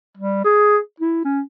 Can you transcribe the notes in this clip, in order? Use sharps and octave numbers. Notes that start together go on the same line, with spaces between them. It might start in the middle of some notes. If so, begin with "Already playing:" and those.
G3
G#4
E4
C#4